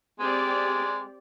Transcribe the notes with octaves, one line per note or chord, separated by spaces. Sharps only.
G#3 C4 G4 D5